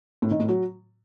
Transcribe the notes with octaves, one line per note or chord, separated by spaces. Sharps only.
A2
D#3
A2
F#3